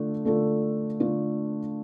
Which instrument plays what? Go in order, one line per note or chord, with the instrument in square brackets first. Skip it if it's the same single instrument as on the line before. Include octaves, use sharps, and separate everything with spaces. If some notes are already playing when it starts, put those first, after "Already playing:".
Already playing: [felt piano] D3 A3 D4 F4 A4
D3 A3 D4 F4 A4
D3 A3 D4 F4 A4